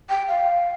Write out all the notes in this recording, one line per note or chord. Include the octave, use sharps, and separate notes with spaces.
G5
F5